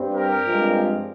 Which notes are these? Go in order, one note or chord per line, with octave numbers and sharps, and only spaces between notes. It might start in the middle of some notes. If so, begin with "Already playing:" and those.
Already playing: G2 G3 C4
G4 A#4
G2 F3 G#3 C4